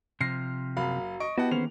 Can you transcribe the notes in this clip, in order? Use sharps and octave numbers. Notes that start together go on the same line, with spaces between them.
C3 F3 F6 A#6 C7
F#1 F#4 F5 A#5 B5
D#5 C#6 D7
B3 E4 F#4 G4 D#5 F#5 A5
D#3 E3 A#3 C#4 G#4 C5 F7